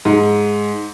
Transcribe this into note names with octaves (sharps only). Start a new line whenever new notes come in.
G#2